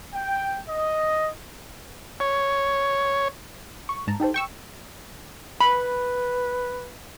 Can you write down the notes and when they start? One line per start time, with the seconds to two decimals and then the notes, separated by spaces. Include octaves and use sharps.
0.13 G5
0.69 D#5
2.20 C#5
3.89 C#6
4.07 G#2 A5 A#5
4.20 D#4 G4 A4 C5
4.34 G5 C#6 E6
5.61 B4 B5